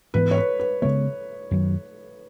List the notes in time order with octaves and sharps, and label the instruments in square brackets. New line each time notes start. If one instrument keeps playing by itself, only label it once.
[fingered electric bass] G#2 E3 B3 [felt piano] B4
[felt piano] C#5
B4
B4
[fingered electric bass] C#3 G#3 B3 [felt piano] C#5
[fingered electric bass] F#2 D#3 F#3